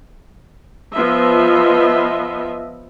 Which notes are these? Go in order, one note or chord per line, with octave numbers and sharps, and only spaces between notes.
F3 B3 F4 D#5 E5